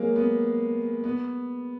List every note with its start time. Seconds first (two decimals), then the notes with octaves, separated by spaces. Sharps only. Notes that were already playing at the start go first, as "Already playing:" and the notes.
Already playing: F#3 G#3 A#3
0.16 B3
1.04 B3